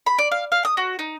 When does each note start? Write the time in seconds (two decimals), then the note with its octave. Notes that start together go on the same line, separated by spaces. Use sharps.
0.06 B5
0.18 D5
0.32 F5
0.52 F5
0.65 D#6
0.77 F#4
0.99 D#4